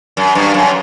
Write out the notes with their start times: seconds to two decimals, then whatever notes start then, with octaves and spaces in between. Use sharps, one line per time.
0.17 F#2
0.35 G2
0.54 F#2